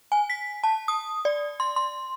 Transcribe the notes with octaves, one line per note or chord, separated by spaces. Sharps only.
G#5
B6
A5
D#6
D5
C6
C6